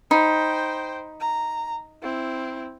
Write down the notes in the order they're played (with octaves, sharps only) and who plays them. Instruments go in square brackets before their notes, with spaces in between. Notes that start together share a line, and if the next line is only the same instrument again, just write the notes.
[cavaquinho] D#4 B5 [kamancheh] C5 G5
[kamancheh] A#5
C4 E4